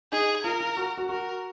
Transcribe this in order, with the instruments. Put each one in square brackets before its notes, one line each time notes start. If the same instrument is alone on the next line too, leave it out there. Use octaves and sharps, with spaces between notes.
[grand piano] D#4 [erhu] G#4
[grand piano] F4 [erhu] A#4
[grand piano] F4
F#4
F#4
[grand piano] F#4 [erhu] A#4